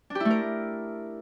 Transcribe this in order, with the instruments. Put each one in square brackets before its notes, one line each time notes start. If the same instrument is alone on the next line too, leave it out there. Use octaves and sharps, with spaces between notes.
[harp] D4
G4
E4
A3
A#4